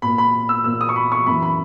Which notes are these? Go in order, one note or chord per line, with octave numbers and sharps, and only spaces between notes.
A#2 A#3 B5
B5
E6
A#2 A#3 E6
D#6
C#6
B5
C#6
F#2 E3 A#3 B5
B5